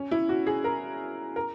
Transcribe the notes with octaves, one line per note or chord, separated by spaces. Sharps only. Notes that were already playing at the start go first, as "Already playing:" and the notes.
Already playing: C#4
E4
F#4
G#4
A#4
A#4